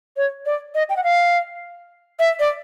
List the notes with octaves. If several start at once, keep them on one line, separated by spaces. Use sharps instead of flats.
C#5
D5
D#5
G5
F#5
F5
E5
D5